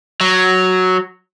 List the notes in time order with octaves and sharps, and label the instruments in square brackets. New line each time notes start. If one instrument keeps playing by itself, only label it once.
[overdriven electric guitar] F#3